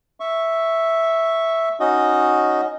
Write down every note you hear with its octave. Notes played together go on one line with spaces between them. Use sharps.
E5 C#6
C#4 D#4 F#4 D#5